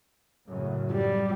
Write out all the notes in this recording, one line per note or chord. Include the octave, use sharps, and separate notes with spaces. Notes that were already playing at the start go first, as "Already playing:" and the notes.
F#2 A2 C#3
G3